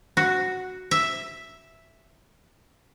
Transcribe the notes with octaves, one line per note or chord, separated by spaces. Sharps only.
F#4
E5